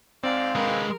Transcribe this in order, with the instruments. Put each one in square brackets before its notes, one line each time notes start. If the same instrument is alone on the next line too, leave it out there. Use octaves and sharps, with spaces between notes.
[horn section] G#2 F5 [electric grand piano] C4 [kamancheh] D5
[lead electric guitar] G#3 B4 [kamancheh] A#4